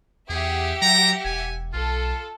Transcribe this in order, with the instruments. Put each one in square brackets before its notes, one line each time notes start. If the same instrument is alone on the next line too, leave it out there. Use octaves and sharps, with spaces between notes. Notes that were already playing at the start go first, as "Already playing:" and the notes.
[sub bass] E2 [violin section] G4 E5 F#5 [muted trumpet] G#4
[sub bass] F#3 [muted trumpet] A#5
[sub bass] E1 [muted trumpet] G#5
[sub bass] B1 [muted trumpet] F4 [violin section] A4